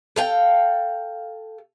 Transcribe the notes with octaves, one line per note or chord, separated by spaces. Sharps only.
A4 F5 G5